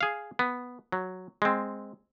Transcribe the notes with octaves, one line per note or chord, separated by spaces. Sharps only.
G#4 F5
B3
F#3
G#3 C4